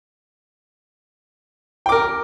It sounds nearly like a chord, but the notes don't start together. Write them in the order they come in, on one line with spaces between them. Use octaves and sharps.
G5 D6 A#4